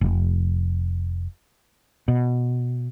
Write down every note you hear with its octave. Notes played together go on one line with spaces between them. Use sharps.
F1
B2